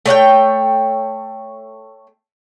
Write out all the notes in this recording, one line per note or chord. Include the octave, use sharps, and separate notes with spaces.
A3 C#5 F#5 G5